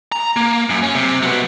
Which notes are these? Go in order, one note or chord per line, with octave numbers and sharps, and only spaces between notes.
A#5
A#3
F#2
C#4
C3
F#3 B3